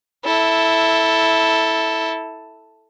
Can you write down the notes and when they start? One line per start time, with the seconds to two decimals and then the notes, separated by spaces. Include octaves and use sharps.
0.25 E4 A4